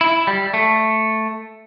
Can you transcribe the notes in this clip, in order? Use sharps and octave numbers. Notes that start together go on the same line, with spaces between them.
E4
G3
A3